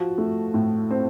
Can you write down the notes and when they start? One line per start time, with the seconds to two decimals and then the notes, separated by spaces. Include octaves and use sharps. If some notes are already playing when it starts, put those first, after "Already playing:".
Already playing: F3 F#4
0.18 A3
0.54 A2
0.91 C4